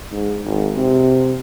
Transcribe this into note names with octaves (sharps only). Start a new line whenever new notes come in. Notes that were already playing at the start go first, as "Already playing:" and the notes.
G#2
G#1
C3